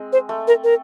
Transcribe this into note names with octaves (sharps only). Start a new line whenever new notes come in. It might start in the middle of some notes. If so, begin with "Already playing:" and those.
Already playing: G#3 C4
C5
A3
A#4
A#4